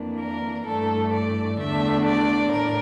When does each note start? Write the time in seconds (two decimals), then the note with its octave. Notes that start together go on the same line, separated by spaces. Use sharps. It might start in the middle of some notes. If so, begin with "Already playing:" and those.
Already playing: F2 E3 A#3 D4
0.20 A#4
0.66 G2 E3 A3 D4 A4
1.13 D5
1.59 E2 D3 A3 D4 E5
2.05 D5
2.51 A2 A#4